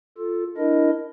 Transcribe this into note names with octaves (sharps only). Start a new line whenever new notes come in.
F4 A4
D4 E4 A#4 D#5